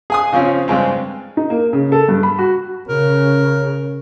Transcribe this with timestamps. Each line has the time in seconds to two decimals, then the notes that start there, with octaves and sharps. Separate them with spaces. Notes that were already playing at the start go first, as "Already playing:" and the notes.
0.10 G#4 G#5 D#6
0.33 C#3 F3 C4 C#4
0.68 G2 C#3 G#3 C4
1.37 D#4
1.50 A#3
1.73 C#3
1.92 A4
2.08 G2
2.23 B5
2.38 F#4
2.88 C#3 A#4